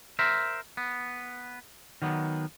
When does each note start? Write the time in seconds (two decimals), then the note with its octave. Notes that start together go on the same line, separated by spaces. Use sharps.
0.19 A#4 C5 E5
0.77 B3
2.02 D#3 F#3 B3